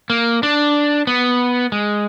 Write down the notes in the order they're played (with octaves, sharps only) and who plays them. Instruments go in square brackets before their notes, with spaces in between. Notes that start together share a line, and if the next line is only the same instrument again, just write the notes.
[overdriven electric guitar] A#3
D4
B3
G#3